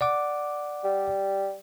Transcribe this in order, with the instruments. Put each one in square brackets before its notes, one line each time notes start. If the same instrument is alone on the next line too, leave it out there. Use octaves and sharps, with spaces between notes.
[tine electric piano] D5 F#5 D6
[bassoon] G3